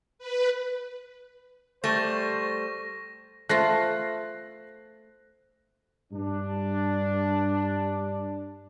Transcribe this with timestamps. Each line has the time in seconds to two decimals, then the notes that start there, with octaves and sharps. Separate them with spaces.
0.19 B4
1.84 G3 A3 C5 C#6 A#6
3.49 A3 F4 C5 E5 F#6 A#6 C7
6.12 G2 D4